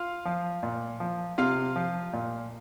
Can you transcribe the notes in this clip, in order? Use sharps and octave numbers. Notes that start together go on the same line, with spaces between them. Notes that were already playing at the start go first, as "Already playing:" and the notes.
Already playing: F4 F5
F3
A#2
F3
C3 F4 F5
F3
A#2